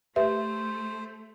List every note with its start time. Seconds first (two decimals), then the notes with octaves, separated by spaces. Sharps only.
0.16 A3 G4 B4 C5 E5